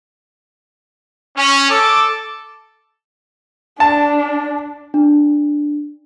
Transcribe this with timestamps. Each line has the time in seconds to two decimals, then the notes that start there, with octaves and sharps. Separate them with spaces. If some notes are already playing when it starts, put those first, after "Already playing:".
1.37 C#4
1.69 A4 D6
3.80 D4 A5
4.94 D4